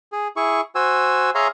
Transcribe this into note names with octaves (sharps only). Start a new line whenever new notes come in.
G#4
E4 G#4 C#6
F#4 C5 G#5 E6
G#4 C#5 E5 F5 A#5 C6